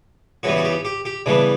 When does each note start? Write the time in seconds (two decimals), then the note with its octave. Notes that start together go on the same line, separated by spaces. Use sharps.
0.43 C#3 E3 G3 B3 F#4
0.56 F#4
0.65 G4
0.85 G4
1.05 G4
1.26 C#3 E3 G3 B3 D4